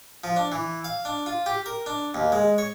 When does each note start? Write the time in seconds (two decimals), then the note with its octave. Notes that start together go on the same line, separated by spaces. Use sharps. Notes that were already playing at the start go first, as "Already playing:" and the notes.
0.24 F3
0.36 D4
0.52 E3
0.84 F5
1.05 D4
1.26 F4
1.46 G4
1.66 A#4
1.86 D4
2.14 D#2
2.32 G#3
2.58 C#5